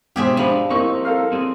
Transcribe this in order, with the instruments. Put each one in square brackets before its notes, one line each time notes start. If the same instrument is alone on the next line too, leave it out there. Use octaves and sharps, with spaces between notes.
[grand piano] G#2 C5 [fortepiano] B2 [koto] G4 G#4 E5
[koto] F3 [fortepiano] D4 B5 [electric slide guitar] G#4 B4
[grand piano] A#3 [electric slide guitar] C4 D#4 E4 [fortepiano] C#6
[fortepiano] A4 A#4 F5
[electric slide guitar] C4 G#4